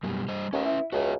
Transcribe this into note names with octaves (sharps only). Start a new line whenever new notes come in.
F#2 B2 G3
G3 C5 D#5
D#2 C#4 B4
E4
C#2 F#4 B4 E5